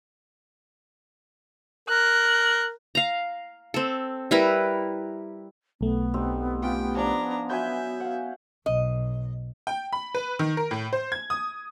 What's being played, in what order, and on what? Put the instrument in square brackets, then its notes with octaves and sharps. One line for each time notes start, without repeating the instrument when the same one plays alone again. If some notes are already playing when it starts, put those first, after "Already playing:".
[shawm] A#4 [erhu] F#6
[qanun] F5 A#5
C4 A4
G3 E4 A#4 B4
[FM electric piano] B1 A3 [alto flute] B3
[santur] G3 C4 D#4
[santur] C#4 F4 G4 [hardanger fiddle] G5
[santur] F3 G#5 [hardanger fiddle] D4 A#5
[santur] F#3 B4 C#5 [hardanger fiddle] E5 [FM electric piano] G#5 G6
[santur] F5 F#5
[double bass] B1 [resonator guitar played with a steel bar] D#5
[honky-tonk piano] G5
B5
B4
D#3
A#4
A2
C5
G#6
D#6